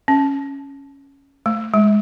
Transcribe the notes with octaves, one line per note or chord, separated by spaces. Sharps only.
C#4
A3
G#3